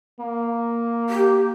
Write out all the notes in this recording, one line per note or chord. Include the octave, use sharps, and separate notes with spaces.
A#3
G4